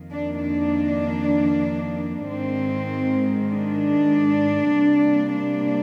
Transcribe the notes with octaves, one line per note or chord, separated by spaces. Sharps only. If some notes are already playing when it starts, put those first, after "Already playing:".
Already playing: F2 D#3 A#3
D4
D4
G#2 D#3 G#3 C4
D4
C3 G3 A#3
D4